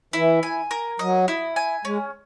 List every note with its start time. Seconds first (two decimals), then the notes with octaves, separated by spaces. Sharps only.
0.13 E3 E4
0.43 G#5
0.71 A#4
0.99 F#3 D#5
1.28 E4
1.56 G#5
1.85 G#3 C#4